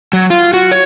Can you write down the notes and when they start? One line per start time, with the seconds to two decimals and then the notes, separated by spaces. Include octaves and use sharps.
0.13 F#3
0.30 F4
0.53 F#4
0.71 C#5